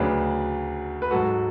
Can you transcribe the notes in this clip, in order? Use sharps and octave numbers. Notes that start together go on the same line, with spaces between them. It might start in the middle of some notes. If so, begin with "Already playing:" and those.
Already playing: D2 C#3 F#3 B4 D5
B4
G#2 F#3 F#4 A4